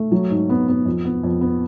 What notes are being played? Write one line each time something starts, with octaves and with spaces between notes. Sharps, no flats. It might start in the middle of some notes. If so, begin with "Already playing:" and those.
Already playing: A3
F#3
G#2
B3
B3
F2
B3
F2
B3